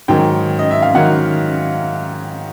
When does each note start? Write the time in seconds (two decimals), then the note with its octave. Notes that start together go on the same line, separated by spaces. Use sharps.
0.08 G#2 D#3 F#3 G5
0.59 D#5
0.71 E5
0.82 F5
0.94 G#2 D#3 F#3 F#5